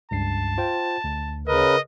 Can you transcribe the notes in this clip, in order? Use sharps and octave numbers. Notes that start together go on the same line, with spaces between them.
C#2 G2 A5 C7
F4 C5 G5
D2
C#3 A#4 B4 D#5